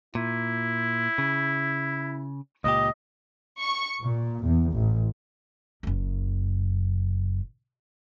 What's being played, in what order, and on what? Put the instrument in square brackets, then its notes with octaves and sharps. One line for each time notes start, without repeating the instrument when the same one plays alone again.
[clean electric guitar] A#2 [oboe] E4
[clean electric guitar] C#3
[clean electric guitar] C#2 A#2 G4 [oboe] D#5
[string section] C#6
A#2
E2
A1
[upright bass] F#1 F#2